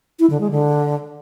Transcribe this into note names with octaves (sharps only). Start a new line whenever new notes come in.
E4
D3
G#3
D3